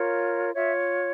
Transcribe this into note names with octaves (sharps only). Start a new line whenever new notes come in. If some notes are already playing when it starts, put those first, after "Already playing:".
Already playing: F4 A#4 C#5
F4 C#5 E5